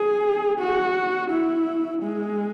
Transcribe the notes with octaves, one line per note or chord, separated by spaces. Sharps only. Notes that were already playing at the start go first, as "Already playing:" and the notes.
Already playing: G#4
F#4
E4
G#3